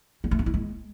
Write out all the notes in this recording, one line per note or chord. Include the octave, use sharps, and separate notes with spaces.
G3
A3
D4
E4
G#3